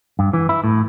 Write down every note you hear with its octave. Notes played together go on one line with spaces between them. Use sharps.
G2
E3
E4
A2